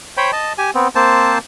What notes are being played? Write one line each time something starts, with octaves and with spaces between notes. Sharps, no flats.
C5 C#5 G5 B5
D#5 A5
G4 G#5
B3 C4
A#3 C4 C5 A5